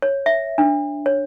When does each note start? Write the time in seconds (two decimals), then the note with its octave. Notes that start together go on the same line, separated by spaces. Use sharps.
0.02 C#5
0.26 E5
0.58 D4
1.06 C#5